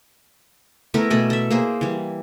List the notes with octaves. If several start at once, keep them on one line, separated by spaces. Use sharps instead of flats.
A3 B3 E4 A#4
B2 A3 D5 G#5
A4 E5
A#3 G#4 C5
E3 G3